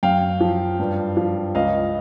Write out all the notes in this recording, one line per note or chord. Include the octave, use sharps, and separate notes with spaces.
F#2 F5 G5
F3
G2
F3
C#2 D#5 F5